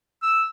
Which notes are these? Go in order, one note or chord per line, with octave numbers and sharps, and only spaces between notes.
E6